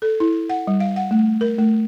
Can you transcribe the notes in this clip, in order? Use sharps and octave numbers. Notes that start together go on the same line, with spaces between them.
A4
E4
F#5
G3
F5
F#5
A3
A#4
A3